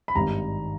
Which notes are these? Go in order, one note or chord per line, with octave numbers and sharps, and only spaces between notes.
B5
G#1 G2 D#3 G3 A#5